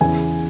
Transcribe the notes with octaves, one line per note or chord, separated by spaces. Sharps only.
E2 C#3 E3 B3 G#5